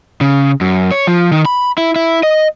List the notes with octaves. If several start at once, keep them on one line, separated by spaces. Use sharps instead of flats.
C#3
F#2
C#5
F3
D#3
B5
E4
E4
D#5